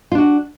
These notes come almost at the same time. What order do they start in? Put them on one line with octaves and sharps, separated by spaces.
F4 D4 F#4